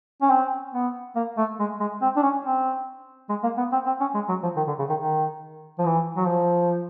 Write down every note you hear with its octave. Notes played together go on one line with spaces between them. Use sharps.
C#4
C4
B3
A#3
A3
G#3
G#3
C4
D4
C#4
C4
G#3
A#3
B3
C4
C4
C#4
G#3
F#3
F3
D#3
D3
C#3
D#3
D#3
F3
E3
F#3
F3